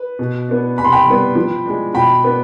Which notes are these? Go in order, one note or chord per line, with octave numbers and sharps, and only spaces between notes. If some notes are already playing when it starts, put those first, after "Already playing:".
Already playing: B4
B2
B3 D4
C3 B5
C6
G5 B5
G3 B3
F3
G#3 D4
B2 G5 B5
B3 D4